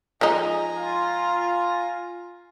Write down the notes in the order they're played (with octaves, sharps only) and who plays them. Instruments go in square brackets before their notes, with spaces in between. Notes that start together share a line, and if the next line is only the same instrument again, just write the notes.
[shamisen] F3 G#3 D#4 [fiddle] G#5 A#5
[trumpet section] F4